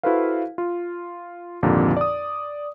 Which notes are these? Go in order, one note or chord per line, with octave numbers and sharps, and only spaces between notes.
E4 F#4 A4 B4 C5 F5
F4
G#1 F2 A#2 D3 F3 G4
D5 D#6